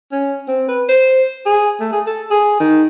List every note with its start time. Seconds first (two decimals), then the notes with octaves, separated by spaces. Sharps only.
0.12 C#4
0.48 C4
0.69 B4
0.89 C5
1.46 G#4
1.80 A3
1.93 G#4
2.07 A4
2.31 G#4
2.60 D#3